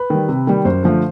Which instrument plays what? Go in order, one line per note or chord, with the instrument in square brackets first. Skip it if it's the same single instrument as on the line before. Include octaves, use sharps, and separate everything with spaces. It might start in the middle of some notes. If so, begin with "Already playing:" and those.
Already playing: [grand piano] B4
D#3 G3
C3
D#3 G3
F#2 C5
D3 F3 A3